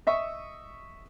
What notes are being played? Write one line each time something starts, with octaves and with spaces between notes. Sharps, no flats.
D#5 E5 C#6 D#6 E6